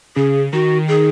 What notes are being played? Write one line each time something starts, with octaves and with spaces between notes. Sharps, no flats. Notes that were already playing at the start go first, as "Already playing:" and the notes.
C#3 G#4
D#3 F#4
G#4